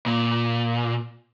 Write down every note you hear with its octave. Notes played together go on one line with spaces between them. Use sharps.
A#2